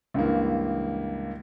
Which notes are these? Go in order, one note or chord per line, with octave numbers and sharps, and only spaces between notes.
C#2 G2 E3 A#3